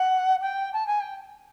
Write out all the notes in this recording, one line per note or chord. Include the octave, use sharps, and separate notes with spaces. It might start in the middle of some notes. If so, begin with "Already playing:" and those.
Already playing: F#5
G5
A5
G#5
G5